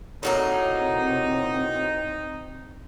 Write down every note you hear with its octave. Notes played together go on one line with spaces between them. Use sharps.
A2 C3 F#3 A#3 C4 D#4